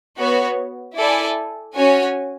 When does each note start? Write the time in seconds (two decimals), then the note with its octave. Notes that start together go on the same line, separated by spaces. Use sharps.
0.18 B3 F#4 C#5
0.97 E4 A4 D5 G#5
1.76 C#4 F#4 C#5 G#5